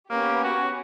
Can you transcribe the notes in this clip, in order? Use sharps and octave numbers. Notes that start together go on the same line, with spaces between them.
A#3 B3 C#4 G4
F#4